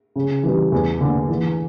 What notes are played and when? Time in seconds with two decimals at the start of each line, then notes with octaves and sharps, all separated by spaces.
0.16 C#3
0.43 E3 G3
0.72 E2
1.01 D3 A#3
1.29 E3